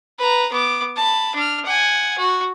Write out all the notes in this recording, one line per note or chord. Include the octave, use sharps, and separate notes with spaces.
B4 A#5
B3 D6
A5 B5
D4 F6
F#5 G#5
F#4